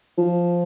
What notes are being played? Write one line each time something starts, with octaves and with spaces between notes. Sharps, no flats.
F3